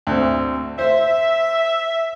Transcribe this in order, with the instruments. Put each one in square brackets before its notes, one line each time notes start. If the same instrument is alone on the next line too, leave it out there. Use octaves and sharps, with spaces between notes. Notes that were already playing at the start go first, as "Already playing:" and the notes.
[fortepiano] D2 C4
[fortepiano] C5 [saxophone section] E5